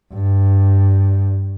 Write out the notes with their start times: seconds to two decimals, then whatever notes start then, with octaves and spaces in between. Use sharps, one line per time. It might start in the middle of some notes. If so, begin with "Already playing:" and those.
0.13 G2